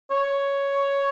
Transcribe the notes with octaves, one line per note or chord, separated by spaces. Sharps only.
C#5